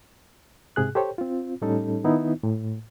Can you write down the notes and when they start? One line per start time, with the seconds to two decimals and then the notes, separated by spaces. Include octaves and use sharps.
0.76 G#2 C3 G#4 F#6
0.95 G4 A4 C5 C#5 G5
1.18 C4 F4
1.62 A2 G3 C#4 D#4 A4
2.04 D#3 B3 D#4 E4
2.43 A2